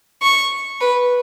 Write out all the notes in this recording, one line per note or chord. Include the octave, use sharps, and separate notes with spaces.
C#6
B4